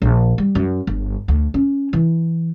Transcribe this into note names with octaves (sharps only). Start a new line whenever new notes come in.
A#1
G3
F#2
G1
D2
C#4
E3